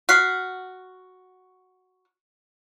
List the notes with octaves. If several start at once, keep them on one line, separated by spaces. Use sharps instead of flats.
F#4 F6 B6 C7